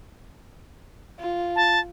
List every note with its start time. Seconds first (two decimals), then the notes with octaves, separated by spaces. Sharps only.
1.19 F4
1.56 A5